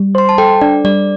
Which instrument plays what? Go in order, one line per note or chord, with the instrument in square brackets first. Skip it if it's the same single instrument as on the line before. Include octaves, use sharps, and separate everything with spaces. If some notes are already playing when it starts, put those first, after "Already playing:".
Already playing: [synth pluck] G3
[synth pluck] C5 [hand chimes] C6
[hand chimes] A5
[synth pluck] A4 [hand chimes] G5
[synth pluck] D4 [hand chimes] D5
[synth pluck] G3 [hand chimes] D5